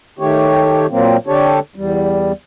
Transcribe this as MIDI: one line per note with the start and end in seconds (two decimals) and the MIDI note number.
0.19 0.86 51
0.19 0.86 57
0.19 0.86 67
0.19 0.86 73
0.91 1.17 46
0.91 1.17 54
0.91 1.17 58
0.91 1.17 60
1.27 1.59 50
1.27 1.59 62
1.27 1.59 67
1.27 1.59 69
1.27 1.59 73
1.76 2.32 40
1.76 2.32 55